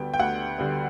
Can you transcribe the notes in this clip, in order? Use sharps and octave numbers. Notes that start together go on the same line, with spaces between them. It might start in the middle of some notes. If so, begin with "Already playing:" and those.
Already playing: D2 D3 G3 B3 G5
G5
D2 F#5
D3 G3 B3